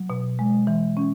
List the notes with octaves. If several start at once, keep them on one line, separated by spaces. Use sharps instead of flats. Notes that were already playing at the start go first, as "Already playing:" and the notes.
Already playing: F#3
B2
G#3
E3
C#4